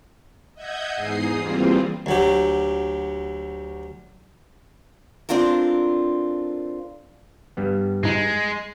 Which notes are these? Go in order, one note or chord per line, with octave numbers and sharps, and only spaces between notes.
D#5 E5 F#5 G6 G#6
E2 G#2 D#4 G#4 D#6 C7
E3 G3 A#3 C4 F4 G#4
D2 F#3 G4
C4 D4 F4 A4 A#4
G2 G3 B3
G#2 G#3 D#4